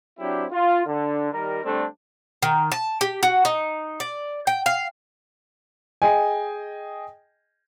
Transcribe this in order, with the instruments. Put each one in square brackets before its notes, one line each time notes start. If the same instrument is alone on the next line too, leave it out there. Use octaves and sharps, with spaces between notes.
[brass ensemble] F#3 C4 D4 E4 G4
F4
D3
D#3 G3 A#4
D3 G3 A3 C4 D4
[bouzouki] D#3
A5
G4
F#4
D#4
D5
G5
F5
[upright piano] G#4 D#5 G5 G#5